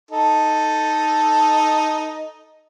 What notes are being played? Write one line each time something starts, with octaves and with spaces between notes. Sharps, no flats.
D#4 A4